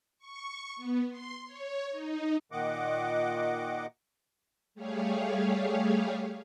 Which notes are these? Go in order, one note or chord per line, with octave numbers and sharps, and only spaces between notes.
C#6
B3
C6
C#5
D#4
A#2 D#3 D#5 F#5 D6
G3 A3 G4 G#4 C#5 F5